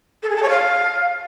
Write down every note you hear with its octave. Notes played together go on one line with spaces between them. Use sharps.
A4
G#4
A5
C#5
F5